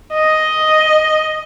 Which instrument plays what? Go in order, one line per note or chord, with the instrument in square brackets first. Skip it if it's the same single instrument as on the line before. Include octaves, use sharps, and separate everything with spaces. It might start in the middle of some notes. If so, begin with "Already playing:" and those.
[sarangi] D#5